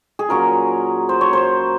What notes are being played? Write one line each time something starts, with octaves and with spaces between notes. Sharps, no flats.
G#4
A#2 F#3 C#4 F4 A#4
C5
C#5
C5